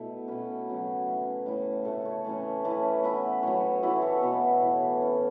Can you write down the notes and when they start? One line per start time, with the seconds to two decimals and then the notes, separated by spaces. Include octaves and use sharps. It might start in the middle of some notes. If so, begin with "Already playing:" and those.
Already playing: B2 A3 B3 E4
0.28 B2 A3 C#4 B4
0.67 C#3 F#3 B3
1.07 E3 A3 C#4 E4
1.46 A2 A3 E4
1.85 C#3 A3 E4 A4
2.05 C#5
2.24 E3 A3 C#4
2.64 E3 A3 C#4 E4 B4
3.04 E3 B3 E4 B4
3.43 A2 F#3 B3 C#5
3.83 E3 B3 E4 F#4
4.02 A4
4.22 B2 B3 E4
4.61 A2 E3 B3
5.01 A2 E3 C#4